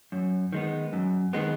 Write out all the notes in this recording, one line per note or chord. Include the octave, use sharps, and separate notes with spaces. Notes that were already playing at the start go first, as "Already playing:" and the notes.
F#2
D#3 G#3 B3
F#2
D#3 G#3 B3